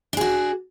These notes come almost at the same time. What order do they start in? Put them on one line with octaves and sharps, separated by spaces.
D4 G#4 F#4